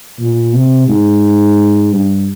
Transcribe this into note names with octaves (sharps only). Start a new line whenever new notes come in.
A#2
C3
G#2
G2